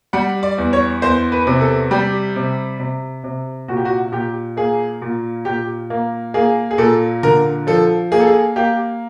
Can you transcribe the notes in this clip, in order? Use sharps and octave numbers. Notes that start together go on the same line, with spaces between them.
G3 F#5
D5
E2
C#5
E2 C5
B4
C3
A4
G3 G4
C3
C3
C3
A#2 F#4
G4
F#4
A#2 G4
A#3 G#4
A#2
A#2 G4
A#3
A#3 G#4
G#4
A#2 A4
D3 A#4
F3 A4
A#3 G#4
A4
G#4
A#3 G4